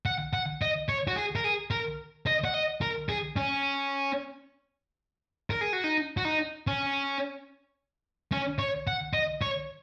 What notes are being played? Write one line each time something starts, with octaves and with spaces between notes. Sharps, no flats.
F#5
F#5
D#5
C#5
F#4
G#4
A#4
G#4
A#4
D#5
F#5
D#5
A#4
G#4
C#4
A#4
G#4
F#4
D#4
F#4
D#4
C#4
C#4
C#5
F#5
D#5
C#5